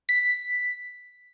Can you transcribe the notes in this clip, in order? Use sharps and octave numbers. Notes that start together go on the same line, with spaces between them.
B6